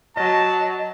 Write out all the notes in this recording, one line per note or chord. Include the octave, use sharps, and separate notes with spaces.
F#3 D#5 A5